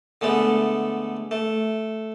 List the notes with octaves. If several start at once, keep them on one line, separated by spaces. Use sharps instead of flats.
D3 G#3 A3 B3
A3